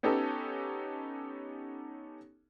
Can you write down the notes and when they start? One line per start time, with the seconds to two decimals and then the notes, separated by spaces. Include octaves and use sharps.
0.03 B3 C#4 D#4 G4 A4